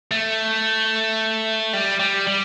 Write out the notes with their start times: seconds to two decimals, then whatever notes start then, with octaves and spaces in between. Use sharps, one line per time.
0.11 A3
1.73 G3
2.00 G3
2.27 G3